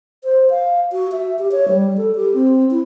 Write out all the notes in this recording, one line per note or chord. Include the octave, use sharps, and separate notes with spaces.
C5
F5
F#4
E5
G4
C#5
G3
A4
G4
C4
E4